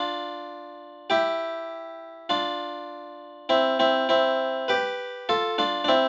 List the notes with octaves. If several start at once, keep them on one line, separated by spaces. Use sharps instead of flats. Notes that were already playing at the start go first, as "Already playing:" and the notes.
Already playing: D4 F4
E4 G4
D4 F4
C4 E4
C4 E4
C4 E4
G4 B4
F4 A4
D4 F4
D4
C4 E4